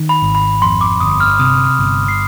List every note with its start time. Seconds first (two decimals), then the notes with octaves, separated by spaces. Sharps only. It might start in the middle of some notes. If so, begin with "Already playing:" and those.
Already playing: D#3
0.09 B5
0.22 G#1
0.35 B5
0.62 F2 C6
0.81 D6
1.00 G1 D#6
1.20 F6
1.39 C3 D#6
1.66 F6
1.79 G1
2.08 C7